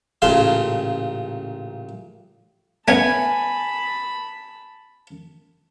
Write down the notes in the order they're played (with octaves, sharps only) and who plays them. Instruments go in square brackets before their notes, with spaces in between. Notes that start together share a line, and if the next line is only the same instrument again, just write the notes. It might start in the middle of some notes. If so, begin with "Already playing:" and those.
[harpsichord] A1 A#2 C#3 F5 A5 C6
[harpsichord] A3 B3 C#4 [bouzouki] G#5 [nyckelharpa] A5 B5